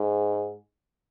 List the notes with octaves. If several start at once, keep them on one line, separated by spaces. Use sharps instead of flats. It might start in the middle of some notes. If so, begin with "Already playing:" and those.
Already playing: G#2